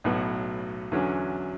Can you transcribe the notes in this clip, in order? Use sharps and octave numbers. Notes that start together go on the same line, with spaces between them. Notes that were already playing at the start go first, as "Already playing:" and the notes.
B1 A2 F#3 B3 F#4
E2 D3 F#3 C#4